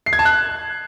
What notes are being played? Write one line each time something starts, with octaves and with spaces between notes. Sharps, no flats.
C7
G#6
A5
F#6